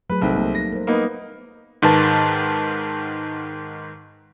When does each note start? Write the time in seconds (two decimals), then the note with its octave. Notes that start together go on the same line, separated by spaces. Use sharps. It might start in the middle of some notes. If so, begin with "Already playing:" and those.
0.10 F#3 A3 G#4 B4
0.22 C2 G3 C4 D#4 A4
0.35 G3 G#3 A#3
0.55 A#6
0.73 A#4 C5
0.87 A#3 B3 D#4
1.82 G#2 D#3 B4 A5